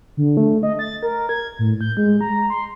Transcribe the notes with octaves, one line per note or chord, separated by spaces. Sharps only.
D3
A3
D#5
A6
A#4
G#6
A2
G6
G#3
A#5
C6